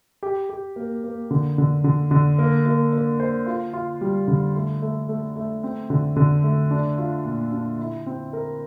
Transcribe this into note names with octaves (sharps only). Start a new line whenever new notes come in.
G4
G4
A#3
A#3
D3
D3
D3
D3
A#3
A#3
A#3
C5
F4
F4
G3
D3
A3
A3
A3
A3
C4
D3
D3
A3
D4
F4
A#2
D4
E4
C4
A#4